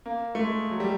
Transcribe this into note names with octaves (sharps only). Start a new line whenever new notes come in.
A#3
A3
G#3
F#3
G3